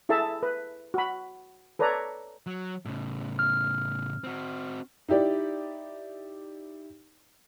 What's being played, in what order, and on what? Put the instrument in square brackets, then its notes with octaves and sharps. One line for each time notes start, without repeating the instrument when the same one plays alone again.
[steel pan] E4 G#4 A4 E5 A5
B4
F#4 B5
A4 B4 C#5 D5 A#5
[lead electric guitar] F#3
A2 C#3
[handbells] F6
[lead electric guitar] C4 F#4
[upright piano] D#4 E4 G4 D5